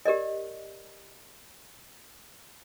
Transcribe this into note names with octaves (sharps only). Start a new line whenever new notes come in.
G4 A#4 D5 D#5